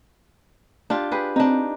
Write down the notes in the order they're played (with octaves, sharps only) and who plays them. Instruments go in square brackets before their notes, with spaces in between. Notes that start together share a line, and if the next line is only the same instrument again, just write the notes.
[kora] D4 F4 G4
G4 G#4 B4
[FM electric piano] C4 [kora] D4 D#4